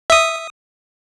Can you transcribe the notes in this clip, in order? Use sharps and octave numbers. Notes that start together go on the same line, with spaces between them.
E5 D#6